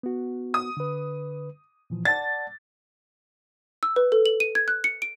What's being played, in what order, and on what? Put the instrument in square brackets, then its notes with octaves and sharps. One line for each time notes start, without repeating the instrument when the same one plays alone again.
[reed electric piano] B3 F#4
[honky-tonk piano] D#6
[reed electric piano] D3 B4
A#2 E3 F3
[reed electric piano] D5 F#5 A5 [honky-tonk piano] A6
[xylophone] E6
B4
A4
F#7
D#7
G#6
F#6
C#7
D7